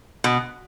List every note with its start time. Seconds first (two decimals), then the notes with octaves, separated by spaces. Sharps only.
0.24 B2